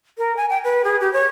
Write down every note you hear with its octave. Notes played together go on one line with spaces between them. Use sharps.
A#4
G#5
G5
B4
G#4
G4
C#5